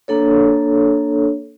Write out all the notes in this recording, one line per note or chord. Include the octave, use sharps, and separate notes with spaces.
A#3 D4 A4 C#5